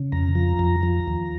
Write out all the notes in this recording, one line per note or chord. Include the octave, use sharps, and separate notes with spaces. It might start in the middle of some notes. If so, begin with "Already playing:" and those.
Already playing: C#3
F2 A#5
F3
F2
F3
D#2